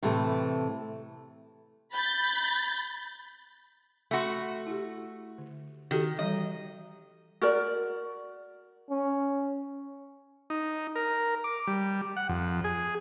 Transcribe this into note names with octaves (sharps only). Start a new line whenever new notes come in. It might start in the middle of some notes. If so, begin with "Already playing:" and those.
A2 C3 E3 A3
B5 G6 A6
A3 F#4 G#5 B5 C6
E4 G4
D3
D#3 F#4 G4 A4
E3 G3 D#5 A#5
F#4 A#4 D5
C#4
D#4
A#4
D6
G3
F#5
F2
G#4